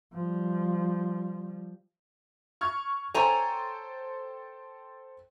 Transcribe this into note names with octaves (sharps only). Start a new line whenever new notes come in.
F3 G3
C#6 F6 G#6
A4 C5 C#5 G5 G#5 A#5